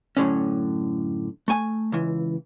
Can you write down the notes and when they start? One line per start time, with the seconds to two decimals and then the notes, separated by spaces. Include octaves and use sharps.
0.17 F#2 A2 D3 C#4
1.48 A3 G#5
1.92 C#2 E3